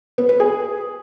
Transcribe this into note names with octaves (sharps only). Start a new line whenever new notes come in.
B3
B4
G#4